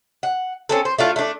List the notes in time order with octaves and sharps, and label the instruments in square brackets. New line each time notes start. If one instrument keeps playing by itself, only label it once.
[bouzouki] F#5
C4 C#4 A4
C5
A3 D4 F4
A3 D4